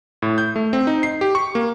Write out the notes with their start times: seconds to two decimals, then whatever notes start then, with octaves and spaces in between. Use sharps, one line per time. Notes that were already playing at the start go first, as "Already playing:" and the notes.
0.22 A2
0.38 G6
0.56 A3
0.73 C4
0.87 D#4
1.03 C7
1.21 G4
1.35 C#6
1.55 A#3